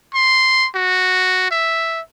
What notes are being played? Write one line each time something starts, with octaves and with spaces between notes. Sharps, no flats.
C6
F#4
E5